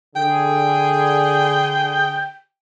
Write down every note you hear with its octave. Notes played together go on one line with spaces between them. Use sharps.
D3 G#4 G5